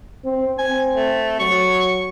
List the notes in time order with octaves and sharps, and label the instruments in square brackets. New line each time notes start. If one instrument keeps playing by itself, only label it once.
[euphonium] C4
[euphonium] C4 [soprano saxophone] G#5
[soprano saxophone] A3
[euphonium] F#3 [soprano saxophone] C#6